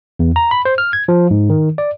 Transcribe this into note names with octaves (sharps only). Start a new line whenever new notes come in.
E2
A#5
B5
C5
F6
G#6
F3
G#2
D#3
D5